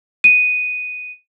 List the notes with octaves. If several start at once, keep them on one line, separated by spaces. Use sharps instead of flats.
D#7